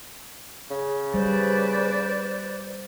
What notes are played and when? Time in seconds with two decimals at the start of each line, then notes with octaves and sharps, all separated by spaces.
0.71 C#3
1.14 G3 B4 C5 D5